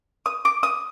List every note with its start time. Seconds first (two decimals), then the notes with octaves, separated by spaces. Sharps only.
0.26 D#6
0.45 D6
0.63 D#6